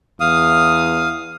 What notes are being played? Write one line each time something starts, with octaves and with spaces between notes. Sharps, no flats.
E2 F5 D#6